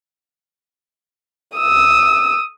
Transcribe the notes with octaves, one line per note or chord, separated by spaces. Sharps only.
D#6 E6